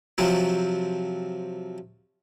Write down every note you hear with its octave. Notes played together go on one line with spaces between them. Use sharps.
C3 F3 F#3 C4